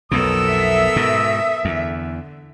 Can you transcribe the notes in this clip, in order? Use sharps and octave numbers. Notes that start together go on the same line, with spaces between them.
B1 F2 B2 B3 A4 A#4 D#6 E6
E5
G#2 B2
E2 D3